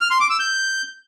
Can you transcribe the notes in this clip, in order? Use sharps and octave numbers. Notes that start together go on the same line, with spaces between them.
F6
C6
D6
E6
G6